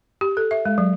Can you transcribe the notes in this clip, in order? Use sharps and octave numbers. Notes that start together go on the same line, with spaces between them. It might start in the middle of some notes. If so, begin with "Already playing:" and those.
G4
A4
E5
G#3
F#3